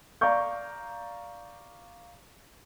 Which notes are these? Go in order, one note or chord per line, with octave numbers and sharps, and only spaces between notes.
D5 F5 A#5 C#6 G6